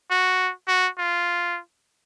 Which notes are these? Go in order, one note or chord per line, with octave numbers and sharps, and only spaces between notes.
F#4
F#4
F4